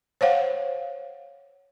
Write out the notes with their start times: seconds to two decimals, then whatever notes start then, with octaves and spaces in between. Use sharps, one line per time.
0.21 C5 C#5 F5 F#5